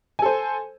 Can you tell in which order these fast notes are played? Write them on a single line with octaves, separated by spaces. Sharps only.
G#5 A4 C5